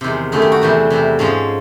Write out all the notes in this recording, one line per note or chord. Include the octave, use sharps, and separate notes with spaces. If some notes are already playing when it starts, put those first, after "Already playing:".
E2 C3 D#3 G#3
F#2 D#3 F#3 A3 G#4
G4
F#4
E2 C3 E3 G3
E2 C3 E3
G#2 F3 G#3 C#4